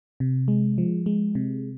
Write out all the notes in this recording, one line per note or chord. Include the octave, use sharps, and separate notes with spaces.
C3
G#3
F3
G#3
C3